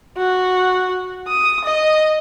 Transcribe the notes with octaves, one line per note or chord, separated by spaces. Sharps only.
F#4
D#6
D#5